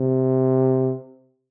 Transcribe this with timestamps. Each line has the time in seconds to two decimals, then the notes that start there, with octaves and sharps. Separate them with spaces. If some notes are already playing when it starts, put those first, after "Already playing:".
Already playing: C3